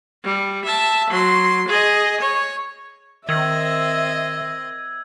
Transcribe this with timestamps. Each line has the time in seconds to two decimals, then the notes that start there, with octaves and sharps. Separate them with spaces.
0.24 G3
0.65 E5 A5
1.10 F#3 C6
1.68 G#4 D#5
2.21 C#5
3.29 D#3 C4 D#5 E5 E6 G#6